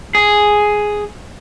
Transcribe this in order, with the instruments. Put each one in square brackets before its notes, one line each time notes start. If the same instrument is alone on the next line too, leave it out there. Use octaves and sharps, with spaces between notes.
[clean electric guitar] G#4